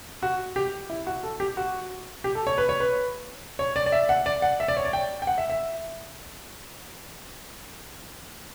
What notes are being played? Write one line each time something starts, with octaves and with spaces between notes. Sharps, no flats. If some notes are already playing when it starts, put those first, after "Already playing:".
F#4
G4
E4
F#4
A4
G4
F#4
G4
A4
C#5
B4
C#5
B4
C#5
D5
D5
E5
F#5
D5
F#5
E5
D5
C#5
D5
G5
G5
F#5
E5
E5